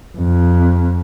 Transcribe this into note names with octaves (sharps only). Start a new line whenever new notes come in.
F2